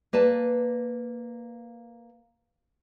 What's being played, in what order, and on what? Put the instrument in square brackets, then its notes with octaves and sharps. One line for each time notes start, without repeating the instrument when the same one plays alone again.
[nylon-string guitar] A#3 B4 D5 A5